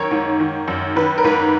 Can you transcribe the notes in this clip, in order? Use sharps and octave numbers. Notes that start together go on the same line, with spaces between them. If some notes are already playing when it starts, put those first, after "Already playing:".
Already playing: F#2 D#3 A#4 C#5
G#2
D#3
F#2
D#3 B4
A#4
G#2 B4